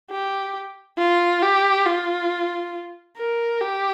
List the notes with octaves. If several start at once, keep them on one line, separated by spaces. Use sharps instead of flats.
G4
F4
G4
F4
A#4
G4